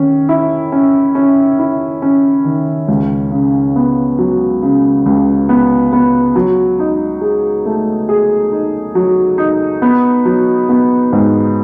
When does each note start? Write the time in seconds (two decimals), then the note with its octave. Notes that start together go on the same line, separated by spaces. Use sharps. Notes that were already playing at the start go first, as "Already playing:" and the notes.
Already playing: D#3 C#4
0.29 E4
0.72 C#4
1.15 C#4
1.59 E4
2.02 C#4
2.45 D#3
2.88 C#2
3.31 C#3
3.76 B3
4.19 F#3
4.62 C#3
5.06 C#2
5.49 B3
5.92 B3
6.36 F#3
6.79 D#4
7.21 G#4
7.66 A3
8.09 G#4
8.52 D#4
8.95 F#3
9.38 D#4
9.82 B3
10.25 F#3
10.69 B3
11.13 G#2